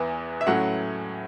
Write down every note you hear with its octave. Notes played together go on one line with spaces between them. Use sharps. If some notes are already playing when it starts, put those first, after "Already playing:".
Already playing: E2 E3 B3
E5
A2 F#3 A3 C#4 F#5